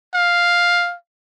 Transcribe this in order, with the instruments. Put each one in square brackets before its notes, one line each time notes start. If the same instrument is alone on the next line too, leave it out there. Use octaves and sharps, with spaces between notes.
[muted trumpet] F5